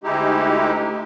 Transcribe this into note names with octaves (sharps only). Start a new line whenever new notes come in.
D2 G#3 D#4 E4 G4